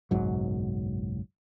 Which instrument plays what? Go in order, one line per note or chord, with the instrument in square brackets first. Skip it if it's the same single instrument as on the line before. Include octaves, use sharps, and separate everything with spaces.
[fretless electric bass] F#1 B1 G#2 F#3